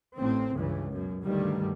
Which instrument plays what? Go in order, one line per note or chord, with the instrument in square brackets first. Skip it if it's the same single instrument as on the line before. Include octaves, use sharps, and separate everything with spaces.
[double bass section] A1 A2 C4
C#2 G2 E3
F#2 B2
D2 G2 D3 D#3 G3